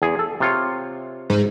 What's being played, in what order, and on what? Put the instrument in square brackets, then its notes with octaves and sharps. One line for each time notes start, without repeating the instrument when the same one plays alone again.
[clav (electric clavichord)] E2 G#4
A4
C3 F4 C#5
[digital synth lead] G#2